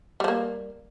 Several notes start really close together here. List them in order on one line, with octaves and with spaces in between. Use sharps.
G3 F3 A#3